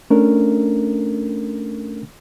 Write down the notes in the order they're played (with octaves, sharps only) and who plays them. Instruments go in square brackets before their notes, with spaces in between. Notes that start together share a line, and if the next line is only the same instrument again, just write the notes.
[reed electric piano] A3 C#4 D4 A4 A#4